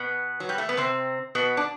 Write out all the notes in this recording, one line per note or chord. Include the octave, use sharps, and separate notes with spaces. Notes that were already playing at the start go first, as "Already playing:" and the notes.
Already playing: B2 B3
F#3
G3
A3
B3
C3 C4
B2 B3
D4